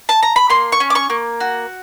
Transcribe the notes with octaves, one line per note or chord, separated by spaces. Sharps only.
A5
A#5
B5
A#3 C6
C#6
C#4
D6
C#6
A#3
F#4